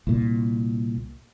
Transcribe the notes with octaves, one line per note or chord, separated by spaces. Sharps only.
C2 A#2